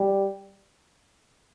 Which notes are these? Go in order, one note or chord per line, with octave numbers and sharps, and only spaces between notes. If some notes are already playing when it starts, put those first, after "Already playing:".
Already playing: G3